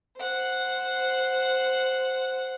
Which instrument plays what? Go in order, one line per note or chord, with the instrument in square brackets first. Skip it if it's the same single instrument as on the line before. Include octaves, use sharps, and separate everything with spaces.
[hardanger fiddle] C5 F#5